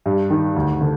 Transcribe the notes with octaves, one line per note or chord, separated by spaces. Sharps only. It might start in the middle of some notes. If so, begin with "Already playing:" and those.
G2
D#3
D2
D3